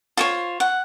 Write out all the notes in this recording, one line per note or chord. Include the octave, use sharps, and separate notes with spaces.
F4 C5 C#5
F#5